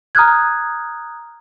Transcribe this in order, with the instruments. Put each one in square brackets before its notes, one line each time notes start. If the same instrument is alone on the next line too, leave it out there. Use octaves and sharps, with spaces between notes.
[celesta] A#5 D#6 F6 F#6 G#6